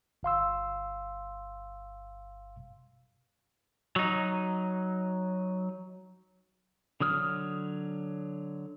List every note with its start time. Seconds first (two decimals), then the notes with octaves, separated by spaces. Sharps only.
0.23 G1 F5 C6 E6
3.96 F#3 D#4
7.00 D3 F#3 D#6 F6